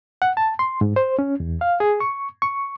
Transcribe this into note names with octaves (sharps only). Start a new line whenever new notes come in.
F#5
A5
C6
G#2
C5
C#4
E2
F5
G#4
C#6
C#6